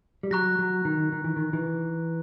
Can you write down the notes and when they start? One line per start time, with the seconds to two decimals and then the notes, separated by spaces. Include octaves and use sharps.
0.23 G3
0.31 F#3 A#5 C#6 F#6 A#6
0.59 F#3
0.85 D#3
1.12 D#3
1.24 E3
1.36 D#3
1.53 E3